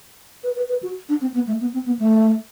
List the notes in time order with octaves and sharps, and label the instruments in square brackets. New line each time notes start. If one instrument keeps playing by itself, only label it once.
[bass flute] B4
B4
B4
F#4
D4
C4
B3
A3
B3
C4
B3
A3